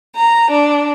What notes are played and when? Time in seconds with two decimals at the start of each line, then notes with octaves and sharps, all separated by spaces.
0.16 A#5
0.53 D4